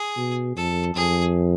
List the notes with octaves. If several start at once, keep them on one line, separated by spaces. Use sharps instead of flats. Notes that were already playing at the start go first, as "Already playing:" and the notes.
Already playing: G#4
B2
F2 A4
F2 G#4